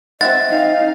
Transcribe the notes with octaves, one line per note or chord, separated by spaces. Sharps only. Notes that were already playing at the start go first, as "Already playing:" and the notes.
C4 D#5 E5 F#5 A6
D#4 F5